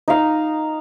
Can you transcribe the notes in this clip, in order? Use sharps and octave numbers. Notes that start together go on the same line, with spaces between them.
D#4 F5